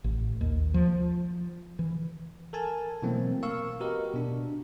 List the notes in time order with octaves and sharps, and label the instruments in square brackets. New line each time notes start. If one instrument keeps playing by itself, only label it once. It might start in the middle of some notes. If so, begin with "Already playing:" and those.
[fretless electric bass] A1
D#2
F3
E3
[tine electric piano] A4 A#4 G#5 A5
B2 E3 F#3 A3 A#3 C4
A#4 F5 C#6 E6
F#4 G4 A#4 B4 D#5
B2 D4